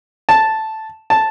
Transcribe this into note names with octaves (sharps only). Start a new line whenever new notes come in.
A5
A5